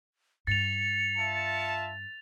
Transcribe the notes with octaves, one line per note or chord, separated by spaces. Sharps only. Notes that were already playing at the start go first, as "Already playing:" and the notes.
G2 A6 C#7 F7
F4 E5 A5